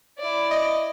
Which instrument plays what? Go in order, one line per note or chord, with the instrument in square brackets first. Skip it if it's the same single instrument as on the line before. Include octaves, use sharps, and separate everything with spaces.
[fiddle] E4 D5
[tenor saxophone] D#5